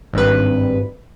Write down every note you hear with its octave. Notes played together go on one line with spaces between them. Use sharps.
G#1 G2 B4